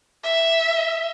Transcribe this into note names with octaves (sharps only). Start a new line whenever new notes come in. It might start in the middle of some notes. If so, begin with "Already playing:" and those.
E5